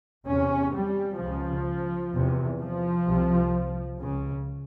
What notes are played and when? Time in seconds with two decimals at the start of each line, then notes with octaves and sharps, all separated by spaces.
0.27 E2 C3 C#4
0.74 G3
1.19 C#2 C#3 F3
2.12 E2 C3
2.59 F3
3.06 C2 C3
3.99 C#2 C#3